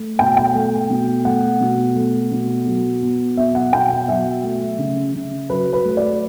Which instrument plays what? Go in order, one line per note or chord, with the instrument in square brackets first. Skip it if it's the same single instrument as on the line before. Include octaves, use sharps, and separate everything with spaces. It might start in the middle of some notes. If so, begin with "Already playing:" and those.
Already playing: [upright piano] A3
B2 G5
G5
A3
B2
A3 F#5
B2
A3
B2
F#3
B3
B2 E5
F#5
B2 G5
F#5
F#3 E5
A3
C#3
C#3
F#3 B4
B4
A3
D5